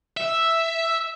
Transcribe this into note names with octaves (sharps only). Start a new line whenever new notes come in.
E5